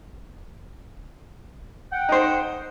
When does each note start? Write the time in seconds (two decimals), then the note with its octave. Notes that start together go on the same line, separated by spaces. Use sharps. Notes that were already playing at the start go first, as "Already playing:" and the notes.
1.93 F#5 G5
2.09 D#4 C5